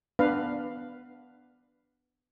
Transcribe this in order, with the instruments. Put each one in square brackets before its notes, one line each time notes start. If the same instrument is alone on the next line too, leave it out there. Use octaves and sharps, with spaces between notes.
[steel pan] B3 D4 B4 F5